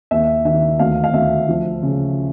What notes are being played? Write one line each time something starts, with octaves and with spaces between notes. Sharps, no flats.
D#2 E5
D#3 E5
D2 F5
F5
D2 E5
F3
C#3